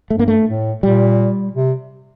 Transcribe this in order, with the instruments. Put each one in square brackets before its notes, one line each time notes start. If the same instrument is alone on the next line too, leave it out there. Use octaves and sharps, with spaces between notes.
[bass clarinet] G2 [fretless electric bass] A3
[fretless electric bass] A#3
A3
[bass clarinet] A2
[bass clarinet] A#2 [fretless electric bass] G3
[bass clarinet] C3